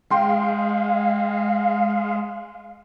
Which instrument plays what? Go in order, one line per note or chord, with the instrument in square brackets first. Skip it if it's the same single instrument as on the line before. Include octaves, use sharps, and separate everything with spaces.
[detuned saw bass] G#3 [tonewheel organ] F5 [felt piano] G5 C6